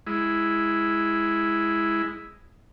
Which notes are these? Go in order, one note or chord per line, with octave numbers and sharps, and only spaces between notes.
G#3 E4